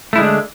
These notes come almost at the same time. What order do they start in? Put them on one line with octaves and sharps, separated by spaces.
A3 E4 G#3 D3 D4